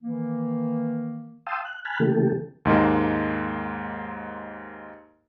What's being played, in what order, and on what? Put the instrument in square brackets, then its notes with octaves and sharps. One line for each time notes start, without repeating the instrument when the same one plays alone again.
[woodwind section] D#3 E3 A#3
[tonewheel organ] F5 G5 A5 C6 D#6 E6
F#6
G#5 A5 B5 F6 F#6
C#3 E3 A3 A#3 G4 A4
[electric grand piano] D#2 G#2 G#3 A#3